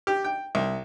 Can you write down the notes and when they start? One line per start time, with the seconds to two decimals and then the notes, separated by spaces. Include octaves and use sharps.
0.07 G4
0.24 G5
0.55 C2